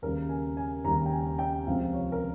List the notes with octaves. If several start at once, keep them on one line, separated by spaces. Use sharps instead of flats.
D#2 C#3 G3 A#4
G#5
G#5
D#2 C#3 G3 A#5
G5
G#5
G5
C#2 C3 F3 C4 F5
C#5
A#4